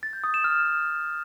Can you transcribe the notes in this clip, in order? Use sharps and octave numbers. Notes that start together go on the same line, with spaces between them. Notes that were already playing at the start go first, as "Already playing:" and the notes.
A6
G6
D#6
E7
F6